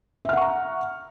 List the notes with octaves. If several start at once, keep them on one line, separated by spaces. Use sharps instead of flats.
E5 F#5 A#5 C#6 F6